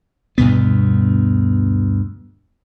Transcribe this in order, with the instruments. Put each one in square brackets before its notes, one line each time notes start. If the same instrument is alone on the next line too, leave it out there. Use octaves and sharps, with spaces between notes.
[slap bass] D2 G2 B2 B3